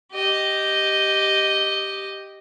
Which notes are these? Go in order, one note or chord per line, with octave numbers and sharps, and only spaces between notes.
G4 D#5